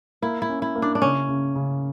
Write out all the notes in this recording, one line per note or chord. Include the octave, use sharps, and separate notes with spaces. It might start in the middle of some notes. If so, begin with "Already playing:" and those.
A#3 E4
E4
C#4
E4
A#3
D4
D4
C#3 C#4
C#3
C#3